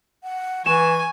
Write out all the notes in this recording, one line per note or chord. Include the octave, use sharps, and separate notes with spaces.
F#5
E3 G#5 C#6 E7